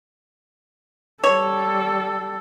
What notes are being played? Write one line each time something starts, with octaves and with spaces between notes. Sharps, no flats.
G3 A4 C#5